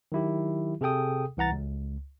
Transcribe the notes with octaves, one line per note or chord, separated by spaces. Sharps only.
D#3 F#3 E4 G4
C3 G#4 A4 G5 D#6
C2 E3 F#5 A#5 A6
C#2